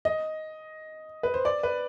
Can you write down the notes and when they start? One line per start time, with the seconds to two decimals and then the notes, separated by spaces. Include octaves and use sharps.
0.05 D#5
1.23 B4
1.34 C5
1.45 D5
1.63 B4